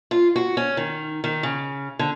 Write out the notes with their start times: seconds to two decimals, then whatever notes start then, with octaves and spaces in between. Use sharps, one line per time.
0.11 F4
0.36 F#4
0.57 C#4
0.77 D#3
1.24 D#3
1.43 C#3
1.99 D3